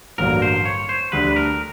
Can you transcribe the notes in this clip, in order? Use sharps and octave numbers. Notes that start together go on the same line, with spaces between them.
A1 G2 D3 F#3 A#3 A#4
C5
C#5
C5
D2 D3 G3 B4
B4
A#4